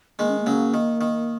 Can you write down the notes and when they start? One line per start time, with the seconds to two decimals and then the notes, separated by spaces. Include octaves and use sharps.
0.19 D#3 G#3 A#3
0.29 C#4
0.40 A#3
0.46 C#3 F#3
0.74 D#3
1.01 D#3